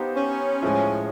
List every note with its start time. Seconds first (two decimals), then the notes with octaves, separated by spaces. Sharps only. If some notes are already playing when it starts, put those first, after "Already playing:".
Already playing: B3 D#4 G4 C5 F5
0.16 C#4
0.62 A2 F3 G#3